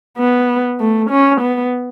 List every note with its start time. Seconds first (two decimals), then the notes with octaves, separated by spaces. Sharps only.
0.18 B3
0.80 A3
1.10 C#4
1.41 B3